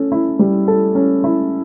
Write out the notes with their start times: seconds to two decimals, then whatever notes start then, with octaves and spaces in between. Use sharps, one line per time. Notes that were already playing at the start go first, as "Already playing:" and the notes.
Already playing: C#4 A4
0.12 E4
0.39 G3
0.68 A4
0.95 C#4
1.24 E4